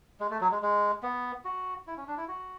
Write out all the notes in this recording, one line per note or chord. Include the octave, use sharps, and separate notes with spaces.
G#3
A3
F#3
G#3
G#3
B3
F#4
E4
C#4
D4
E4
F#4